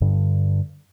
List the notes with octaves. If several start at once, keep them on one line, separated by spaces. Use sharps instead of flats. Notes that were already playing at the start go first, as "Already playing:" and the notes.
G2 D3